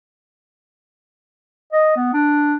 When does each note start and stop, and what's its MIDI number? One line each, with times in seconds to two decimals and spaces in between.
1.73 1.93 75
1.96 2.12 59
2.14 2.55 62